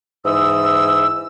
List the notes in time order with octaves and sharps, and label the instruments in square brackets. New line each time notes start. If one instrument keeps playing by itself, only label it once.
[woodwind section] G#2 E3 D#6 E6